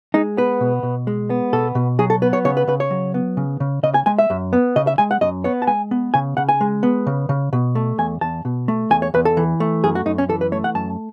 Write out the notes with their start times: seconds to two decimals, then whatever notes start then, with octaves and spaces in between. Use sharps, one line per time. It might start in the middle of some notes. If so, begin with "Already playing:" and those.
0.14 G#3 D#4
0.37 B3 B4
0.61 B2
0.83 B2
1.07 G#3
1.30 B3
1.53 B2 A4
1.75 B2
1.99 F#3 G#4
2.10 A4
2.22 B3 B4
2.33 C#5
2.45 C#3 C#5
2.57 B4
2.68 C#3 B4
2.80 C#5
2.91 F#3
3.14 B3
3.37 C#3
3.60 C#3
3.83 C#3 D#5
3.94 G#5
4.06 G#3 G#5
4.18 E5
4.30 F#2
4.53 B3
4.76 C#3 D#5
4.87 E5
4.98 G#3 G#5
5.11 F#5
5.21 F#2 D#5
5.44 B3 C#5
5.62 A5
5.67 G#3 G#5
5.91 B3
6.14 C#3 G#5
6.37 C#3 F#5
6.49 G#5
6.61 G#3
6.83 B3
7.07 C#3
7.29 C#3
7.53 B2
7.75 A3
7.98 E2 G#5
8.21 E2 A5
8.45 B2
8.68 A3
8.90 E2 G#5
9.02 C#5
9.14 E2 B4
9.25 A4
9.37 E3
9.60 A3
9.83 F#2 G#4
9.95 F#4
10.06 F#2 D#4
10.18 C#4
10.29 E3 A4
10.41 B4
10.52 A3 C#5
10.64 F#5
10.75 F#2 A5